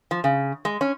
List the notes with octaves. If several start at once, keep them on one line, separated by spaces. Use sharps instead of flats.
F3
C#3
G#3
C#4